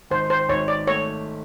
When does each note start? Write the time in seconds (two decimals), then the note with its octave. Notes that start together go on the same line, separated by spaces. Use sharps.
0.10 G#1 C5
0.30 C5
0.49 G#1 C#5
0.68 D5
0.87 A3 C#5